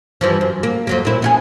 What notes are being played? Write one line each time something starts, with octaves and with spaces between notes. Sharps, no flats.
G2 E3 F3
F#2
A#3
F2 F#3 A#3
A#2 E4
B3 F4 G#4